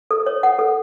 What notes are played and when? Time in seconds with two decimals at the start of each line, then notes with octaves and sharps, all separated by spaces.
0.11 A4
0.26 C#5
0.43 F#5
0.59 A4